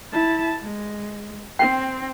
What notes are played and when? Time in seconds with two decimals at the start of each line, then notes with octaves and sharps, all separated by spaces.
0.12 E4 A5
0.63 G#3
1.59 C4 G5